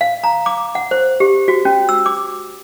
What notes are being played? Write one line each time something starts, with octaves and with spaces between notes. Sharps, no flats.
F5
A#5
D6
F#5
C5
G4
F#4
C#4
E6
D6